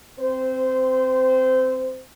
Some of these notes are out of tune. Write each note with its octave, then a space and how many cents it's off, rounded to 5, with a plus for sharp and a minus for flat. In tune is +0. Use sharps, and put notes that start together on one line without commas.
C4 +0 C5 -20